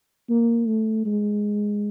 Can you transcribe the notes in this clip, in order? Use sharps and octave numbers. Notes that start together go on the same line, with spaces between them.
A#3
A3
G#3